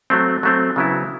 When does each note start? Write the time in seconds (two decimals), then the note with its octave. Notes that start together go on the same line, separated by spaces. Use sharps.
0.10 F#3 A3 C4
0.43 F#3 A3 C4
0.76 C#3 F#3 B3 E4